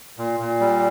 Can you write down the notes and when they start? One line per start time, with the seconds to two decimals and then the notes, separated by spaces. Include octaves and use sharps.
0.18 A#2
0.40 A#2
0.60 G3